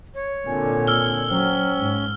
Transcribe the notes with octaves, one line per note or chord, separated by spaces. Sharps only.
C#5
A#2 D3 C4 G#5
E6 F6 G7
F#3 C#4 C5 G5
G#2